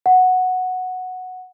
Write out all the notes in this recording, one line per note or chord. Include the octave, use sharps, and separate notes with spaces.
F#5